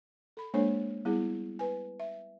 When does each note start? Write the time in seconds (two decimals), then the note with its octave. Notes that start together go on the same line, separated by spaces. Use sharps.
0.37 A4 B5
0.54 G#3 A#3 D4 A4 C5 C#5
1.05 G3 B3 E4 G#4
1.59 B4 G#5
2.00 E5